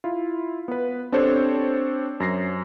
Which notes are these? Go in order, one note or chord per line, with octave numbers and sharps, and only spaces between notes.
E4 F4
B3 B4
C4 D4 G4 A4 C5 C#5
F#2 A#6 C7